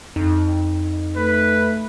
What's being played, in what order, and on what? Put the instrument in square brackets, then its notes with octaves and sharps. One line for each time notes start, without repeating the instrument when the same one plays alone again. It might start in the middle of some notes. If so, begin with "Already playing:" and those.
[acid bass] F2 [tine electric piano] D#4
[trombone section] A3 [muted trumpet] B4